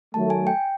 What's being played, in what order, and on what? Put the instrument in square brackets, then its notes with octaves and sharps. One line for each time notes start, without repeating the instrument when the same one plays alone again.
[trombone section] D#3 F#3 A3 [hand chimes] A5
[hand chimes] G#5
G5